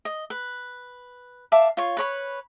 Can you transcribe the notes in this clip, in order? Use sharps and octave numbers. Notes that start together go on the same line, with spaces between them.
D#5
B4
E5 F5 A5 D6
F4 C#5
B4 C#5 B5